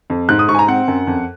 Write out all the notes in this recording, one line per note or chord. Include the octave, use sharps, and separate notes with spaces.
F2
G#2 F#6
D#6
G#2 C#6
G#5
A#5
C4 F#5
F#2
F2